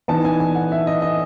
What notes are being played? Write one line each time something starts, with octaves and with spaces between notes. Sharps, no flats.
E3 B3 D#4 A5
G#5
G#5
F#5
E5
D#5
D#5